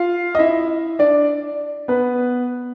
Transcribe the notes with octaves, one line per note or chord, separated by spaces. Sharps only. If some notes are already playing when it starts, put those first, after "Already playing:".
Already playing: F4 F5
D#5
E4 E5
D4 D5
B3 B4